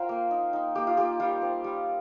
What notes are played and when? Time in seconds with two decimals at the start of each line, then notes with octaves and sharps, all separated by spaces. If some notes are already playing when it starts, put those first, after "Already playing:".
Already playing: F4 A#4 C5 F5 G5
0.09 A#3
0.31 D#4
0.53 D#4
0.75 A#3 G4
0.87 F4
0.97 A#3 G4
1.20 G3 F4
1.42 C4
1.64 G3